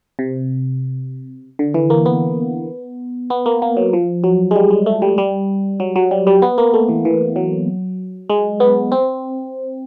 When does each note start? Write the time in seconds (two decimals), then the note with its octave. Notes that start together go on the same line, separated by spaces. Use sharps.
0.19 C3
1.59 D3
1.74 E3
1.90 A#3
2.06 B3
3.30 B3
3.46 A#3
3.62 A#3
3.77 F#3
3.93 F3
4.24 F#3
4.51 G#3
4.56 G3
4.71 G#3
4.86 A3
5.02 G3
5.18 G3
5.80 F#3
5.96 F#3
6.11 G3
6.27 G3
6.42 B3
6.58 A#3
6.74 A3
6.89 E3
7.05 E3
7.36 F#3
8.30 G#3
8.60 B3
8.92 C4